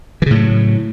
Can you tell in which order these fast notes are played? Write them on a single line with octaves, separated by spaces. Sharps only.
E3 C#3 A2 F#3